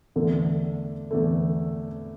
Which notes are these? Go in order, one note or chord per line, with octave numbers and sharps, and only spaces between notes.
E2 D3 A3
E2 D3 A3